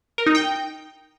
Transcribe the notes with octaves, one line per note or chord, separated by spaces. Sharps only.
A#4
D#4
G5